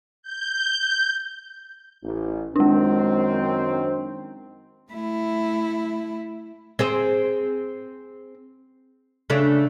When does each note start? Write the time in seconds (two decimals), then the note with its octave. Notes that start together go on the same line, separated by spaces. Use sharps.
0.22 G6
2.03 A1
2.56 F#2 D#3 G#3 C4 D4
4.92 A3 E4
6.79 C4 G#4 C5
9.30 C#3 A3 D4